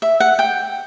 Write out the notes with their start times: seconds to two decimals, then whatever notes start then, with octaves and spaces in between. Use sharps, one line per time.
0.02 E5
0.20 F#5
0.39 G5